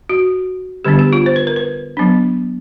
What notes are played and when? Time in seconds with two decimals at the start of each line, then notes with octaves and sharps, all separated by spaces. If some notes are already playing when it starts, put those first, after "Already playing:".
0.09 F#4
0.85 D3 G3 B3 D4 G4
0.99 G4
1.13 F4
1.26 C5
1.36 B4
1.47 A#4
1.56 B4
1.97 F#3 B3 D4